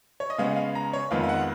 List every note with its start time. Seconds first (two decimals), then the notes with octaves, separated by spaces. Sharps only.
0.20 C#5
0.30 D#5
0.38 C#3 G#3 B3 F5
0.56 F5
0.75 A#5
0.93 C#5
1.11 F2 D#3 G#3 B3 F5
1.23 F5
1.29 F#5